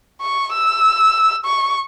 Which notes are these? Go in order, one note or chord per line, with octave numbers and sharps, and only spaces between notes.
C#6
E6
C#6